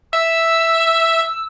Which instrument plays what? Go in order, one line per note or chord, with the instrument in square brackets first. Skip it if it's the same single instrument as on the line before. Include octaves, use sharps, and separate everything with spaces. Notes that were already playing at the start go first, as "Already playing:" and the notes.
[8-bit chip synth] E5 [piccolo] E6